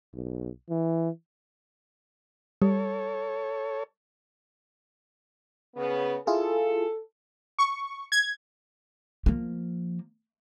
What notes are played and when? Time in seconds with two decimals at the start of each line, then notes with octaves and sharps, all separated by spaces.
0.14 B1
0.70 E3
2.62 G3 A4 C#5
5.76 C#3 B3
6.27 E4 F4 G#4 A4
7.59 C#6
8.12 G#6
9.26 F3 A#3